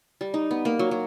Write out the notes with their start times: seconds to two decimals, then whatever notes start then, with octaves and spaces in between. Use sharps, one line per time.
0.21 G3
0.34 D#4
0.51 B3
0.65 A#3
0.79 F#3
0.91 F#3